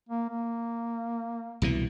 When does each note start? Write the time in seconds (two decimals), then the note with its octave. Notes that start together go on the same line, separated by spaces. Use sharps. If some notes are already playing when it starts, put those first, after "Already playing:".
0.09 A#3
0.29 A#3
1.62 C2 B2 E3